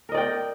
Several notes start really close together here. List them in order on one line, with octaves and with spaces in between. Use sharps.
A#4 D#5 D5 G5